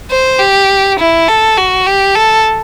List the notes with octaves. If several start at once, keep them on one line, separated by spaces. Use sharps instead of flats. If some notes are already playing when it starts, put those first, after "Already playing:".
C5
G4
E4
A4
F#4
G4
A4